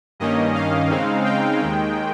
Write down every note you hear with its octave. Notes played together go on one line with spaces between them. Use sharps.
G2 D#3 A#3 C#4 D#5
F5
C#3 G#3 C4 D#4
G5
D#2 D#3 G#3